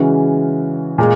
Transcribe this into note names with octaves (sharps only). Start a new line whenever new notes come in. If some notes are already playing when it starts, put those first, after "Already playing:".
Already playing: C#3 E3 G#3 C#4 F#4
A#2 G#3